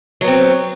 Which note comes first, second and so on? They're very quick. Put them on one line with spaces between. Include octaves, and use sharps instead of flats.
F#3 B3 C4